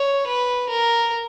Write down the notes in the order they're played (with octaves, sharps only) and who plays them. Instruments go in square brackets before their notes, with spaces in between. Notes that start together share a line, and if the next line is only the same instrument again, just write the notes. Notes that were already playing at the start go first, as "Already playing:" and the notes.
Already playing: [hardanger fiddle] C#5
B4
A#4